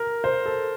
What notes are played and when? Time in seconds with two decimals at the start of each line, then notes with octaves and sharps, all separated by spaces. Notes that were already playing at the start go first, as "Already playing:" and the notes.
Already playing: A#4
0.24 C5
0.46 A4